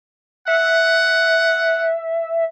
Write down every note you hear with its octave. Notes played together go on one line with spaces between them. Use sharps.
E5 F#5